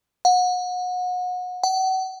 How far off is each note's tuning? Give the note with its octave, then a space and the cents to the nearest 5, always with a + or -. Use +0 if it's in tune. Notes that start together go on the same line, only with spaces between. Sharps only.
F#5 -30
F#5 +35